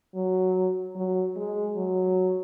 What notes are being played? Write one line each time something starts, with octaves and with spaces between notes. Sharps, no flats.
F#3
F#3
G#3
F#3